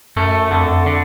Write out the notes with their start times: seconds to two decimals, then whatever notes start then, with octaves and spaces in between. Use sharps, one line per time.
0.16 F#2 A3
0.51 F2 D3
0.86 D3